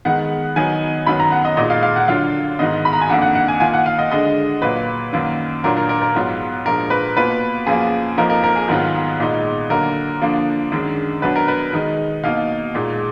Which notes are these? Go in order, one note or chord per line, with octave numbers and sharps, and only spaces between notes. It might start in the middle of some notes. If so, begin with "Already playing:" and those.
D#3 G#3 B3 F#5
D#3 F#3 B3 D#4 G#5
F#2 D#3 F#3 B3 B5
A#5
F#5
D#5
A#2 G#3 D#4 D#5
F5
F5
F#5
D3 F#3 D4 F4 F5
G#2 D#3 G#3 B3 D#5
B5
A#5
G#5
F2 D#3 A#3 D4 F#5
F#5
F#5
G#5
D#3 A#3 F4 G#5
F#5
F5
D#5
D3 G#3 D4 D#5
A#2 F#3 A#3 B4
F#2 D#3 F#3 A#3
A#2 F#3 D4 F4 A#4
A#4
A#4
A#4
G#2 F#3 B3 F4
A#2 F3 G#3 D4 A#4
B4
B2 A#3 F4 B4
F#2 F3 A#3 G#4
F2 F3 A#3 D#4 A#4
A#4
A#4
G#4
G#2 D#3 F#3 B3 F4
A#2 G#3 B3 D#4
D3 F#3 A#3 A#4
D3 F3 A#3 D4
F#2 D#3 G#3 D4
B2 F#3 D4 B4
A#4
B4
D#3 G#3 D#4
B2 A#3 D#4 F5
A#2 G#3 D#4